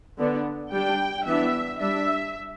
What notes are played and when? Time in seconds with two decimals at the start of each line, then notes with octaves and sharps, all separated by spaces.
0.18 D3 B3 D4
0.72 G3 D4 G5
1.26 E3 B3 D4 E5
1.79 G3 D4 E5